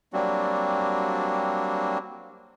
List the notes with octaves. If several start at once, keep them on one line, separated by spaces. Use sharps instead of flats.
F#3 G3 A#3 C4 D4 F#4